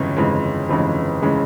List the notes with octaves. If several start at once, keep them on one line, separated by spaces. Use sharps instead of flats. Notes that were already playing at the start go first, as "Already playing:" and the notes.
Already playing: G1 F2 C#3 E3 G#3
G1 F2 C#3 E3 G#3
G1 F2 C#3 E3 G#3
C#3 E3 G#3